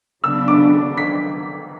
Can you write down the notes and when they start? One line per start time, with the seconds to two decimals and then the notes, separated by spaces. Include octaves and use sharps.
0.24 C#3 F#3 B3 D4 E6
0.48 D6
0.97 B6